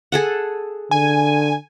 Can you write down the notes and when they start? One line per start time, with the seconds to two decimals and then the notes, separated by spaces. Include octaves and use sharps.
0.12 G#4 A4 F#5
0.91 D3 G#5